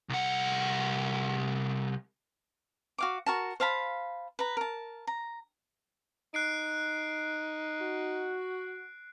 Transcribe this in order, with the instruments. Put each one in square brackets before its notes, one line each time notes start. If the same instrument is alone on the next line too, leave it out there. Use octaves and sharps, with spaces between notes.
[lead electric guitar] C2 F#5
[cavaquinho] F#4 F5 D6
F#4 A#4 A5
C5 F5 A5 B5
B4 A#5
A#4 A5
A#5
[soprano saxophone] D#4 [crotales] F#6 C7 D7
[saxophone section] F#4